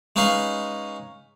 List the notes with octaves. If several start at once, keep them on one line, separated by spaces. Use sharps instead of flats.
G#3 C#4 D#4 B4 F5